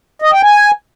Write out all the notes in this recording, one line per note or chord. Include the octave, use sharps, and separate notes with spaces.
D#5
G5
G#5